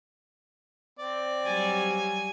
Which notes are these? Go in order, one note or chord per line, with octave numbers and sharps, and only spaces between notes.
C4 D5
F#3 G3 G#5